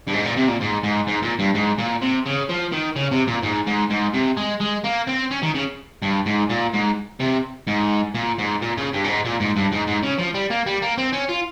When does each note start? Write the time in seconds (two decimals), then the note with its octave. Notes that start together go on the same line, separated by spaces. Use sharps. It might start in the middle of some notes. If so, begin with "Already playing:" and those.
0.07 G2
0.13 G#2
0.24 A#2
0.36 C3
0.48 A#2
0.60 G#2
0.83 G#2
1.08 G#2
1.23 A#2
1.39 G2
1.55 G#2
1.78 A#2
2.01 C3
2.26 C#3
2.49 F3
2.72 D#3
2.96 C#3
3.11 C3
3.27 A#2
3.42 G#2
3.67 G#2
3.90 G#2
4.14 C3
4.37 G#3
4.61 G#3
4.85 A#3
5.08 C4
5.31 C#4
5.43 D#3
5.55 C#3
6.02 G2
6.26 G#2
6.50 A#2
6.73 G#2
7.20 C3
7.67 G#2
8.15 A#2
8.38 G#2
8.62 A#2
8.77 C#3
8.93 G2
9.04 A#2
9.09 G#2
9.25 A#2
9.40 G#2
9.56 G2
9.72 G#2
9.87 G#2
10.03 C#3
10.19 F3
10.35 G3
10.50 A#3
10.66 G3
10.82 A#3
10.98 C4
11.13 C#4
11.29 F4